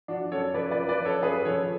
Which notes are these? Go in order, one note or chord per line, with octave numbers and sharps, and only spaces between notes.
F3 D4 F#4
F#2 A4 C#5
F3 B4 D5
B4 D5
F#2
B4 D5
F3
A4 C#5
F#2 G#4 B4
F3 A4 C#5